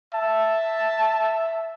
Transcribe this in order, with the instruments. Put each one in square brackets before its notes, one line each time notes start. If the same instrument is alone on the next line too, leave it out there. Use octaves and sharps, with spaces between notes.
[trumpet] E5 [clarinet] A5